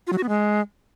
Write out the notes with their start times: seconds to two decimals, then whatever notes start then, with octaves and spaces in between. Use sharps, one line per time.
0.07 F4
0.12 F#3
0.18 F#4
0.23 B3
0.29 G#3